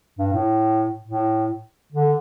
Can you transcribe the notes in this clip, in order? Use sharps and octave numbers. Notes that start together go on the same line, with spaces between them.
G2
A2
A2
D3